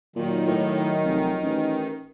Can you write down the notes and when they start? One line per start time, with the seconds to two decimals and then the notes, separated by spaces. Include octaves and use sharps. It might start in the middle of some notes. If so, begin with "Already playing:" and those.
0.16 A#2 D#3 F#3
0.47 A2
1.05 F1
1.42 A1